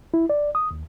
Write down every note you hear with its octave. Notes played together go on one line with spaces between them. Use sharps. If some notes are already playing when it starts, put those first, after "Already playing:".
E4
D5
D#6
D#2